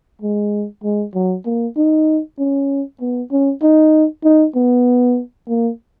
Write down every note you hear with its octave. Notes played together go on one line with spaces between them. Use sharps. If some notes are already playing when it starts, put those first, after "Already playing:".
G#3
G#3
F#3
A#3
D#4
C#4
B3
C#4
D#4
D#4
B3
A#3